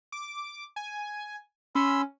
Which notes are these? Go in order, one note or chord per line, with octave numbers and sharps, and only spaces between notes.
D6
G#5
C#4 B5 C6 E6